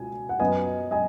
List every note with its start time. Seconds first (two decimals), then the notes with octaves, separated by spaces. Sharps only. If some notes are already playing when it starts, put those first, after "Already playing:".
Already playing: C#2 B2 G#5
0.29 F#5
0.40 F#2 F#3 B3 D#5 G#5
0.91 D#5 G#5